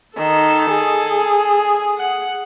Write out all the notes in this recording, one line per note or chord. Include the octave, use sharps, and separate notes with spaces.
D#3 A4
G#4
F#5